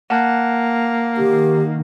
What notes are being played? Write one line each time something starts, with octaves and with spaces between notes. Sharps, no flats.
A#3 F#5 A5 F#6
D#3 G4